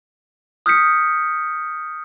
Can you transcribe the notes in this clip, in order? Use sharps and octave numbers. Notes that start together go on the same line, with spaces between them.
D#6 F6 G6 B6 C#7